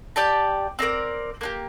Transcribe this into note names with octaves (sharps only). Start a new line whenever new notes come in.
G4 D5 A5
C4 D#4 A#4 D5
A#3 D4 G4